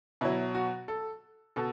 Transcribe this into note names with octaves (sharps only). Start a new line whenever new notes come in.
B2 F#3 E4
F#4
A4
B2 A4